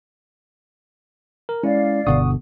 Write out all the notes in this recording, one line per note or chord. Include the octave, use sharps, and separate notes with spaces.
A#4
G#3 C#4 E4 D5 F5
G1 B2 D3 F#5 C#6 D#6